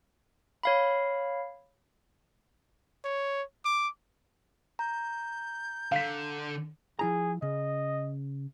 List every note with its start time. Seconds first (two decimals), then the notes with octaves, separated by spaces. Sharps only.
0.63 C#5 F5 B5
3.05 C#5
3.65 D6
4.79 A#5 G6
5.92 D3 F5 B6
6.99 F3 E4 G#4 A#5
7.42 C#3 D#5